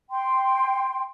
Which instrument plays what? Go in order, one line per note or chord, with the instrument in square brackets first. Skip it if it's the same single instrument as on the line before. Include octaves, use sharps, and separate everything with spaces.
[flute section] G5 C6